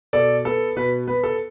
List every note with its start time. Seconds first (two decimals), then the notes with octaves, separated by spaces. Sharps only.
0.13 B2 A4 D5
0.45 B3 A4
0.76 B2 B4
1.08 B3 B4
1.24 A4